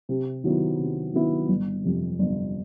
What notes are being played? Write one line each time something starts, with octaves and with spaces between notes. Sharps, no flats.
C3
D#3 F#3 B3 E4
C3
D#3 F#3 B3 E4
G1
F2 C3
G1